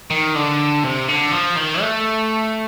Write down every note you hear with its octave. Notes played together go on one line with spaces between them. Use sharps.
D#3
D3
C3
D3
F3
D#3
A3